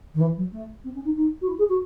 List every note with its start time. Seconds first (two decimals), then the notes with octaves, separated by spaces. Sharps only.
0.14 D#3
0.20 E3
0.36 F#3
0.52 A3
0.84 C4
0.94 C#4
1.04 D#4
1.16 D#4
1.41 F#4
1.48 E4
1.58 G#4
1.69 F#4